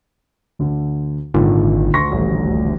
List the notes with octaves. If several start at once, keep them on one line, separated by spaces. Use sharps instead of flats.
D2 D3
G#1 A#2 D3 D#3
D2 C6 C#6 A#6
D#1 A1